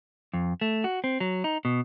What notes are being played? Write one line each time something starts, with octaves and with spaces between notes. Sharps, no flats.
F2
A3
F#4
C4
F#3
D#4
B2